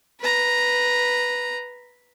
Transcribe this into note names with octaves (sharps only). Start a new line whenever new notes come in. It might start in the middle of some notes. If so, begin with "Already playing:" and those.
B4 A#5